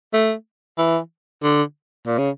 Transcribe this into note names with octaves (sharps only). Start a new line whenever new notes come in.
A3
E3
D3
A#2
C#3